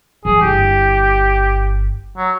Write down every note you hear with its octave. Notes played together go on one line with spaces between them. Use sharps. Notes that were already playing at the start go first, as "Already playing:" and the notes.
E3 F#3 G#4
G1 E4 G4
F#3